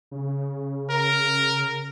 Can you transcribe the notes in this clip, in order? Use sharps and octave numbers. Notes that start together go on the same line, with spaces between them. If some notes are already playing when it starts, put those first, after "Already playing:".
C#3
A#4